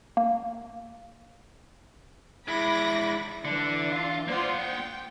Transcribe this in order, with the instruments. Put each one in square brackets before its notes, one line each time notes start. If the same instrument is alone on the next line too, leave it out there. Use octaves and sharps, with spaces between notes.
[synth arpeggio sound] A#3
[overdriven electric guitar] G#3 E4 [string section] B5 D6 A#6
[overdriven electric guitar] D3 [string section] E3 D4
[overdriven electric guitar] F4 F5
[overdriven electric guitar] A#3 F#5 [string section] F4 C5 D5
[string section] G5